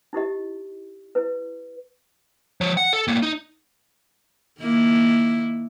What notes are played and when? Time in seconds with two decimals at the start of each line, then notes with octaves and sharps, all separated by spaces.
0.13 D#4 E4 G4 D#5
1.15 E4 B4
2.61 F3 C#5
2.77 F#5
2.93 A4
3.08 A2 A#3
3.22 D#4
4.61 D#3 A#3 E4